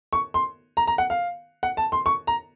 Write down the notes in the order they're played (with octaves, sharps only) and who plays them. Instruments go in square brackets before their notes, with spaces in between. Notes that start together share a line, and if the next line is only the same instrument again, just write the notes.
[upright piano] C#6
C6
A#5
A#5
F#5
F5
F#5
A5
C6
C#6
A#5